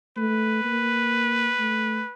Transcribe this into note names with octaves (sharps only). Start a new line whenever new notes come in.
A3 B4
A#3
A3